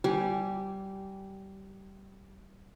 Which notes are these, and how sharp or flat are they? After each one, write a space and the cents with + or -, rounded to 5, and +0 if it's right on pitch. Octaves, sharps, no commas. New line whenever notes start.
G3 -20 G4 -5 G#5 +0